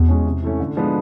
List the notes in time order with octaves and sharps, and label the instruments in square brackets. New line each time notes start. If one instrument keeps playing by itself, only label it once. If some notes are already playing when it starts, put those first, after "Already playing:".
Already playing: [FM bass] E2 [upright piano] B2
[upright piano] G#3 C#4
C3
E3 A3 C#4
D3
F3 G#3 B3 D4